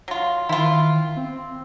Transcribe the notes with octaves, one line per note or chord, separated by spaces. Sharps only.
F#3 F4
D#3 E4 F4
C4